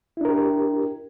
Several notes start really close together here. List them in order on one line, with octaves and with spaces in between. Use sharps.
E4 D4 A#4 G4